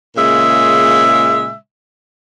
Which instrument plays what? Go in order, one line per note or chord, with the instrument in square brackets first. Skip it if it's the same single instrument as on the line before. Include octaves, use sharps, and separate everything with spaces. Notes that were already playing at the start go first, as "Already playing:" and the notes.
[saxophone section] A#2 C#3 G#3 E5